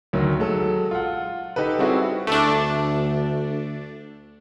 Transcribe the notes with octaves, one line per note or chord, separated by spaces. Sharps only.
D2 D#3 F#3
F#3 G#3 A4
F4 F#5
D#4 G4 A4 B4
G3 C4 C#4 E4 F#4 G#4
D2 A3 D4